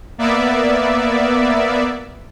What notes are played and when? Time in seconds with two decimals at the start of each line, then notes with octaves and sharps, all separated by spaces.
0.18 A#3 B3 D5 E5